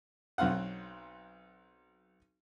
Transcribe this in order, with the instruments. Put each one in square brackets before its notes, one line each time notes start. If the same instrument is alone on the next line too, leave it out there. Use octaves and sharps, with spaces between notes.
[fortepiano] B1 F#3 C4 F5 F#5